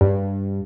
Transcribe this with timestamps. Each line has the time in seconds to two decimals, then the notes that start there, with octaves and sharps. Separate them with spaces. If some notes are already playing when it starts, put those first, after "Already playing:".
0.01 G2